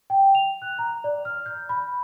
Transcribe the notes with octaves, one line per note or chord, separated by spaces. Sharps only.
G5
F7
F#6
A#5
D5
F6
G6
B5